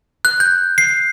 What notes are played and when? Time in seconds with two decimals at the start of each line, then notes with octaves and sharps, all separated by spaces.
0.25 F#6
0.40 G6
0.78 C7